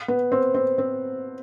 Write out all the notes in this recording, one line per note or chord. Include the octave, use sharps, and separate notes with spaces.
B3
C4
C4
C4